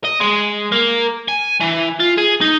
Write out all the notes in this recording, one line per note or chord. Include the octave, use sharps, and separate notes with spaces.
D#5
G#3
A#3
G#5
E3
F4
G#4
D#4